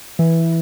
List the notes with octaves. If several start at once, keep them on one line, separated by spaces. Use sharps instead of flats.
E3